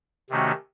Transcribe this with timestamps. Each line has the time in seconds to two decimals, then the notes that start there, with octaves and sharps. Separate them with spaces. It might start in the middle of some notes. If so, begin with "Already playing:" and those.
0.30 C3 D#3 A3 C#4 F#4